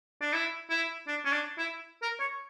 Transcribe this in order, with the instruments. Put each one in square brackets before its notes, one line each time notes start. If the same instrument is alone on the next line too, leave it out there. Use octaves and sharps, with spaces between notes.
[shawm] D4
E4
E4
D4
C#4
D4
E4
A#4
C#5